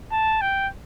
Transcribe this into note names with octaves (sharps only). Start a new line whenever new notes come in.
A5
G5